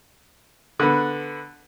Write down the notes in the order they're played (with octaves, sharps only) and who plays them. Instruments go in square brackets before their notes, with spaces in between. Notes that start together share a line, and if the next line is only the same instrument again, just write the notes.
[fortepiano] D3 B3